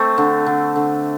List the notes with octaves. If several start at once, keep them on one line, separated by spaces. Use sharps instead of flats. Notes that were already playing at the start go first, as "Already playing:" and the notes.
Already playing: A3 C4
D3
D3
D3